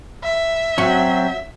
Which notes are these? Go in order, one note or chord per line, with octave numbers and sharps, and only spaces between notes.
E5
F#3 C4 C#4 F#4